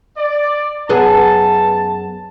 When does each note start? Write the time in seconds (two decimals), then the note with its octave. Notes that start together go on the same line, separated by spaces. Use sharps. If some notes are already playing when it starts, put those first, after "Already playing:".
0.17 D5
0.89 F#2 B3 G#4 A5